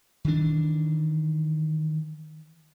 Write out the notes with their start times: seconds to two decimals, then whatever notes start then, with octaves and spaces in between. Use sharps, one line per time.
0.25 D#3 E3 D4